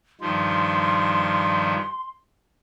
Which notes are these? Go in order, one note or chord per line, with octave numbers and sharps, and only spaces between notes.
G2 D#3 F3 C6